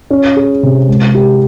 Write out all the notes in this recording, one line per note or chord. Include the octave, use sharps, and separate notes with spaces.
C#4
G#4
C3
G#3
G4